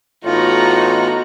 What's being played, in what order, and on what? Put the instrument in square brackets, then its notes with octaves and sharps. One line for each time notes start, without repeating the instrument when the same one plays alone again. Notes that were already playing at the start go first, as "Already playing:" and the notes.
[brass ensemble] A2 E3 B3 [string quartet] D#4 F#4 A#5 [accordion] F4